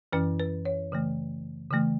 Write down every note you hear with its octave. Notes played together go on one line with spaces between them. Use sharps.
F#2 E3 C#4 E4 B4
B4
C#5
C#3 E3 A3
C#3 E3 A3